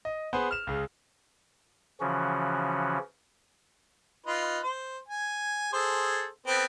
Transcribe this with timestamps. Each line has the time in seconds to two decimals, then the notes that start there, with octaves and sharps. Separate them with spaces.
0.05 D#5
0.33 B3 G#4 B4 C5
0.51 F6 E7
0.67 C#2 C#3
2.00 C#3 E3 F3 C#4 F#4
4.26 D#4 F4 B4
4.63 C5
5.08 G#5
5.73 G#4 A4 C5
6.47 B3 C4 A4